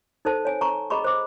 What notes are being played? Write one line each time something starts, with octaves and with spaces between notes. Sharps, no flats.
D#4 A4 C5 A5
C#5 G#5
A5 A#5 C#6
G#4 D#5 A#5 B5 C#6
C5 D6